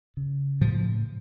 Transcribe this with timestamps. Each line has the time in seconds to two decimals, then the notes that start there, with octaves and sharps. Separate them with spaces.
0.17 C#3
0.61 A2 F3